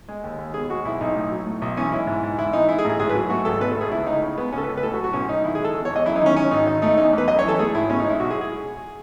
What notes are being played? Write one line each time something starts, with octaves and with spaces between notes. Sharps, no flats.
G#3
D#2
D#2
B2 G#4
G#3 F#4
B1 E4
B1 D#4
A2
F#3
A3
B1
E3 C#4
G#3 E4
G#2
G#2
G#2 E4
E3 D#4
G#3 E4
G#4
A1
G#4
G#2 G#4
B4
F#3
A3 F#4
G#1 A4
B2 B4
A4
A3 G#4
C#2 E4
C#2 D#4
C#3
G#3 B3
C#2 C#4 A4
B4
C#2
B4
A2 A4
F#4
F#3
F#4
B1 C#4
B1 D#4
D#3 E4
G#4
G#3 A4
E2
C#5
E2
D#5
F#2 E4
D#4
D#3 C#4
G#3 C#4
G#1 D#4
D#3 D#4
A3 D#4
E2 D#4
E2
B4
F#2 D#5
C#5
E3 A4
A3 G#4
G#1 E4
B2 C#4
D#4
G#3
E4
B1 F#4
G#4
G#4